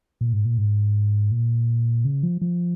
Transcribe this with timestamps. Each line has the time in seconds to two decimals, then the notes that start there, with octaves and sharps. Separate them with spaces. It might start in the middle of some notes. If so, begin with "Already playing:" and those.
0.21 A#2
0.33 G#2
0.45 A#2
0.58 G#2
1.31 A#2
2.05 C#3
2.23 F3
2.41 F3